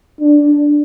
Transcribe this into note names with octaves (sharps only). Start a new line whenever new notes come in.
D4